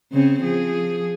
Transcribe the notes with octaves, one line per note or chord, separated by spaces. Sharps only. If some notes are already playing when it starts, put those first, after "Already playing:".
C#3 C4 C#4
F3 G#4